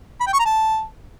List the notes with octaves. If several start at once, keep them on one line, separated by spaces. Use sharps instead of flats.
B5
G5
C#6
A#5
A5